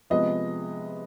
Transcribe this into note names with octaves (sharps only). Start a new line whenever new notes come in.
C3 F3 G#3 B3 D#5